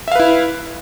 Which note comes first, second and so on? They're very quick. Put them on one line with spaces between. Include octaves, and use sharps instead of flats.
E5 F5 B4 E4